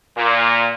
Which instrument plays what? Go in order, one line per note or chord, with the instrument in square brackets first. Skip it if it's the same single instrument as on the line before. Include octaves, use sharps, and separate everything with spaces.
[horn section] A#2